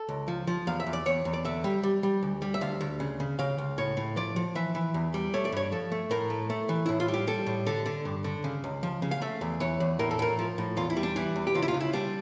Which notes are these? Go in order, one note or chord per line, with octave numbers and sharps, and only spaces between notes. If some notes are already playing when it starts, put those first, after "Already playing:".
Already playing: A4
C#2
F3
F3
E2 F5
E5
E2
D5
E2 C#5
E2
D5
D3 E5
G3
G3
G3
D2
G3
E5
D2 F5
D2
C#3
C#3
C#3 F5
C#2
A2 C#5
A2
F3 D5
F3
E3 E5
E3
E2
G3
A3 C#5
D5
G2 C#5
F3 A4
A3
A2 A#4
A3
A3
E3
A2 E4
F4
G3
G4
G3 A4
A2
D3 A4
D3
G2
D3
C#3
C#2
F3
C#3
F5
A3 E5
E2
E3 C#5
E2
A2 A#4
A4
A2 A#4
F3
A2
E2 F4
E4
G3
D4
E3 E4
E2
G4
C#2 F4
E4
F4
C#3
E4
G3 D4